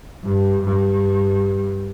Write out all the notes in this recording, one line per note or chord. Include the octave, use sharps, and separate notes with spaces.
G2
G2